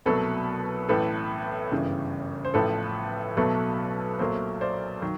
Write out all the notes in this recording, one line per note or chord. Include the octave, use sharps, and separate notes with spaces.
C2 B2 F#3 A3 A4 B4
A1 A2 E3 A4 B4
G1 F#2 C#3 E3 G3
C5
A1 A2 F3 A4 B4
B1 B2 F#3 A3 A4 B4
B1 A#2 F#3 A3 A#4 C5
C5 D5
D#3 F#3